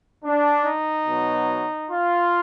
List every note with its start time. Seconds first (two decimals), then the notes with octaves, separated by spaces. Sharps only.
0.24 D4
0.65 D#4
1.06 B2 F#3
1.90 F4